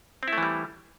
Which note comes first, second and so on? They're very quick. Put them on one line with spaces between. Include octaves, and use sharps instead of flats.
C4 E4 A3 E3 G3